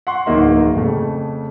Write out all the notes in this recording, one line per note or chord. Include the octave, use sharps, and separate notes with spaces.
F#5 C6 C#6
D1 E2 D#3 A#3 D#5 E5
F2 C#3 A3